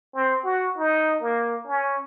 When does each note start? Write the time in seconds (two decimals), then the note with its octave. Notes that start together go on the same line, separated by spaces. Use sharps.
0.14 C4
0.44 F#4
0.77 D#4
1.22 A#3
1.67 C#4